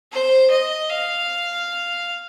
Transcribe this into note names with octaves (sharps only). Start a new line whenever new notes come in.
C5
D#5
F5